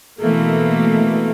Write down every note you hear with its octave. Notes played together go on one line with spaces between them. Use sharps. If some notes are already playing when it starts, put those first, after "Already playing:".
B2 E3 A3 A#3